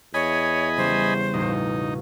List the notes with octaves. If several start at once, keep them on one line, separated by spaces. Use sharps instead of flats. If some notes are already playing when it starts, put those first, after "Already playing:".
E2 C#5 D#5 G#5 B5
C#3 G3 C#4 C5
E1 A1 D#4